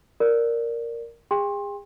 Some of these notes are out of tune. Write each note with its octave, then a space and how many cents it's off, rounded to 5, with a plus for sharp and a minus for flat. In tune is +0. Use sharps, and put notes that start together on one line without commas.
A#4 +0 D5 +0
G#4 -35 G5 +35 C6 +25